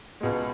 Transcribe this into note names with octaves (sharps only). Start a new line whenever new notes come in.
C#2 B2 G#3